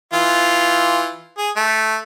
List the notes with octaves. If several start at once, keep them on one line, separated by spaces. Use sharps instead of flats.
E3 F4
G#4
A3